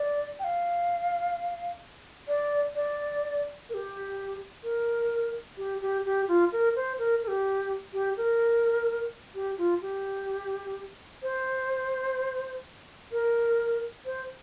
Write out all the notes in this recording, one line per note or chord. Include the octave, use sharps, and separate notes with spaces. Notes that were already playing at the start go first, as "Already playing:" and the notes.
Already playing: D5
G5
F5
D5
D5
A#4
G4
A#4
G4
G4
G4
F4
A#4
C5
A#4
A#4
G4
G4
A#4
G4
F4
G4
C5
A#4
C5